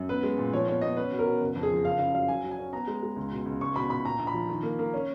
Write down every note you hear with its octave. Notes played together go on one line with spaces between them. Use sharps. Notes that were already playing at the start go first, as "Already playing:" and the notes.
Already playing: F#2
B3 B4
G#3
A#2
F3 C#5
B3 C#5
B3 D#5
C#4 B4
B2
A#4
B2
F#1
F2
G#4
F3
F#1 F5
C#3 F5
F#3 F5
F#3 G#5
F#3
G#5
C#4
B3 A#5
G#3
G#3
C#2
B2
C#2
C#2 C#6
B2 B5
B2 B5
A#2 A#5
A#1
B5
F3
D#3
A#3
A#3
C#4